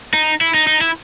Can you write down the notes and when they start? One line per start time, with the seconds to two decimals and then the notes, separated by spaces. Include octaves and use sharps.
0.14 D#4
0.41 E4
0.54 D#4
0.67 D#4
0.81 E4